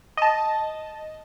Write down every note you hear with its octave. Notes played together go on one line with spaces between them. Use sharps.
D#5 A5